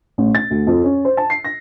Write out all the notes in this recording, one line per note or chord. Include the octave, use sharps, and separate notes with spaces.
A1
A6
D2
F2
C#4
C5
A5
C7
A#6